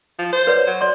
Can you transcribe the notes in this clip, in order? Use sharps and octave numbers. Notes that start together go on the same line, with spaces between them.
F3
C5
B4 C#5 D5
F#3
D5 C6